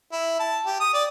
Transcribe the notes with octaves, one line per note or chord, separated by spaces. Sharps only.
E4
A5
G4
D#6
D5